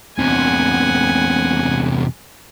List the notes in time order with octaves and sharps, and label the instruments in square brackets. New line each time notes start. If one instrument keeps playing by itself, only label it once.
[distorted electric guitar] E2 C3 [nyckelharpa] F#5 G#5